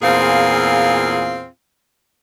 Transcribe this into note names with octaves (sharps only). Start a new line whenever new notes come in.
E2 A#2 C4 F4 G#4 F5